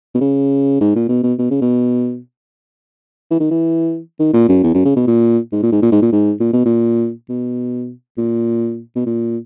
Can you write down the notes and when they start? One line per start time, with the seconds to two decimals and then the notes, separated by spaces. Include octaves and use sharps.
0.15 B2
0.21 C#3
0.81 G#2
0.96 A#2
1.09 B2
1.24 B2
1.39 B2
1.51 C#3
1.62 B2
3.31 E3
3.40 D#3
3.51 E3
4.20 D#3
4.34 A#2
4.49 F#2
4.64 E2
4.75 F#2
4.85 C#3
4.96 B2
5.07 A#2
5.52 G#2
5.63 A#2
5.72 G#2
5.82 A#2
5.92 G#2
6.02 A#2
6.13 G#2
6.40 A#2
6.53 B2
6.66 A#2
7.29 B2
8.18 A#2
8.96 B2
9.06 A#2